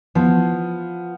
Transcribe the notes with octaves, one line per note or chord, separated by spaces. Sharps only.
F3 B3